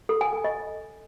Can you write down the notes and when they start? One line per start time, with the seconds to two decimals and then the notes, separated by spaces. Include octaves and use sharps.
0.09 A4
0.21 G#5
0.33 A4
0.44 D#5